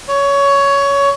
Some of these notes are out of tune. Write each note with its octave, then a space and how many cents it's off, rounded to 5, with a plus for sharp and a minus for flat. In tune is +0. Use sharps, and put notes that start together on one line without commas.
C#5 +15